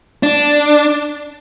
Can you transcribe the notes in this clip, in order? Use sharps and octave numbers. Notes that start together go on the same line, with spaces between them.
D4